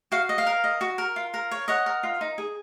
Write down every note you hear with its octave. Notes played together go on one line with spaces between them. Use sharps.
F#4 F5
D#5
F5
A#4
D#5
F#4
A#4
F4
A#4
C#5
C#5 D#5 F#5
A#4
F4
D#4
G#4